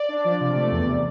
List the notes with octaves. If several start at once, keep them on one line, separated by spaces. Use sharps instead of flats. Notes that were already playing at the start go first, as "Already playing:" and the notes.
Already playing: D5
D4
F3
C3
A3
E2
C3